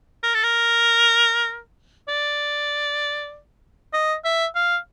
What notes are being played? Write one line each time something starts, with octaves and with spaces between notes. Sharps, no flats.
A#4
A4
A#4
D5
D#5
E5
F5